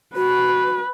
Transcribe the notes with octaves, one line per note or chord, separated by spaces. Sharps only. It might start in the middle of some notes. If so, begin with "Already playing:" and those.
F#4 B4